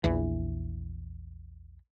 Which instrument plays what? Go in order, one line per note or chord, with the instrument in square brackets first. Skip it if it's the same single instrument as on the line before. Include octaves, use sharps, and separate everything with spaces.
[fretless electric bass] A#1 E2 E3